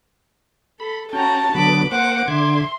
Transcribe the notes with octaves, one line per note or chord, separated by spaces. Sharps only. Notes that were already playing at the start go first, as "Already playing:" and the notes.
A4 B5
C#4 F#4 G5 A5 A#5
D3 F#3 B3 B5 D6
A#3 C5 F#5 D6
D3 E5 C6 D6 G#6